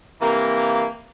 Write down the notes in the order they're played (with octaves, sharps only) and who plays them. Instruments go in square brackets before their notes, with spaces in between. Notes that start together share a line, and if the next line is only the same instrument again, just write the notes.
[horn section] C3 E3 A#3